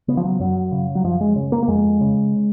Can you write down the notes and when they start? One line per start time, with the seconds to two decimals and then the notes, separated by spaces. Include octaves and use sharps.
0.08 C#3 B3
0.17 F3
0.24 F#3
0.40 F#2 F#3
0.72 C#3
0.95 F#3
1.04 F#2 F3
1.21 G#3
1.36 C#3
1.52 A#3
1.63 A#3
1.68 F2 G#3
2.01 C#3